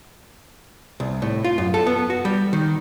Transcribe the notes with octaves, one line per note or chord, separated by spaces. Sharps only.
C2
A2
F4
F#2
A4
B3
F#4
G3
D#3